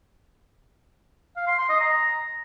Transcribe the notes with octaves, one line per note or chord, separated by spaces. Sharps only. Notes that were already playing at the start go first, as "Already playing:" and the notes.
F5
C6
C6
D#5
A#5